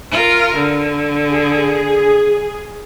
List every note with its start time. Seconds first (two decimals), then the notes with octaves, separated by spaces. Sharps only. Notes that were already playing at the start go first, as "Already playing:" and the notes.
0.11 F4 A#4
0.56 D3
1.30 G#4